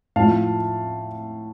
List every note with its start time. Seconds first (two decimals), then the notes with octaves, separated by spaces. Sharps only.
0.16 A2 F3 F5 A5